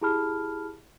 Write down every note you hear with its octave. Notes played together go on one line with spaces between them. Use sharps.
E4 G4 G#4 A5 B5 F6